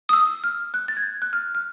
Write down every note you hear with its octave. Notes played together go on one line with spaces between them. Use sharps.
D#6
E6
F6
F#6
A6
G#6
G6
F#6
F6
F6